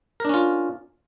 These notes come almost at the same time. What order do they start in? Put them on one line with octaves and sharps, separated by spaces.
A#4 D4 C#4 F4